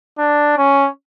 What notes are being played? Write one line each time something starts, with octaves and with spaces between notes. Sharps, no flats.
D4
C#4